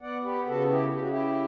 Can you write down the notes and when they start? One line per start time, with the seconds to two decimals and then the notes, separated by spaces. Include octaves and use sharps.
0.01 B3 D5 F#5
0.24 G4 B4
0.47 C#3 F#4 A4
0.70 E4 G4
0.93 C#3 G4
1.01 F#4
1.08 E4 G4